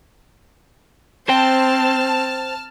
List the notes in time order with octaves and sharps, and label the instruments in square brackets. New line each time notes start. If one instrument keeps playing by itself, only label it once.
[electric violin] C4 [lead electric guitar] C5 G5 [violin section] A5 F6